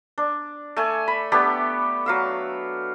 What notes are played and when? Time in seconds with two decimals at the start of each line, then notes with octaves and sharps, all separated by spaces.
0.18 D4
0.76 A3 G#5
1.08 B5
1.32 A3 B3 D4 G4
2.06 F#3 F5 E6